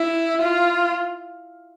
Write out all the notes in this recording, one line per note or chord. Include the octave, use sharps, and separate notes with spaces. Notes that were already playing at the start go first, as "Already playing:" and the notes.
Already playing: E4
F4